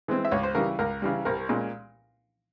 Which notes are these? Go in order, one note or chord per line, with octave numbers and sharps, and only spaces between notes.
E3 G#3 C4
E5
C#2 C#5
C5
C#3 E3 G3 A#4
C#2 A#4
C#3 E3 G3
C2 A#4
A#2 G#3 C#4